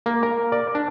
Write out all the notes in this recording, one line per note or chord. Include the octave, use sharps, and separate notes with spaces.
A#3
A#4
D5
D4